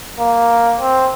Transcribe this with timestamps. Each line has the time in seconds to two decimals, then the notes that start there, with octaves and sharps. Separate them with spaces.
0.20 A#3
0.79 C4